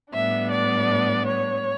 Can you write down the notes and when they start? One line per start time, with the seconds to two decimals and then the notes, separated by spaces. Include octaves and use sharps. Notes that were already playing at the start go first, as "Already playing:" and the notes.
0.13 A2 G3 B3 D4 E5
0.51 D5
1.27 C#5